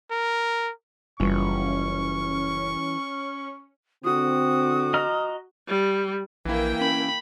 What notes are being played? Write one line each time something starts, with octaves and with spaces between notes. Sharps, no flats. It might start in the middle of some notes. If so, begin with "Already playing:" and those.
A#4
F#1 E3 G3 C#4 F4 C#6
D3 C4 F#4 D#6
D#5 A#5 F6
G3
A#1 E3 A#3 E4 G5
C#4 B5